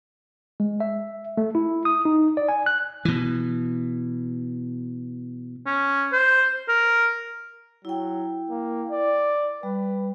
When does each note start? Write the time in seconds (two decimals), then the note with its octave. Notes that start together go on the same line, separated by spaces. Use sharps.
0.60 G#3
0.80 E5
1.37 A3
1.55 E4
1.85 D#6
2.05 D#4
2.37 D5
2.48 G#5
2.66 F#6
3.05 B2 E3
5.66 C#4
6.13 C5
6.68 A#4
7.85 F#3 E4 G5
8.50 A#3
8.91 D5
9.63 G3 B4